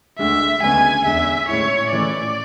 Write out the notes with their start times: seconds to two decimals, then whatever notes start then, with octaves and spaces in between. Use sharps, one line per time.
0.19 D2 D3 G#3 E5
0.63 D2 C#3 G#3 B3 G#5
1.05 E2 D3 G#3 E5
1.49 A2 G#3 C#4 E4 C#5
1.92 A2 E3 A3 C#4 E4 D5